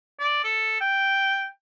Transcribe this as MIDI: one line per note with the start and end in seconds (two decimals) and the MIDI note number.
0.20 0.44 74
0.44 0.78 69
0.80 1.48 79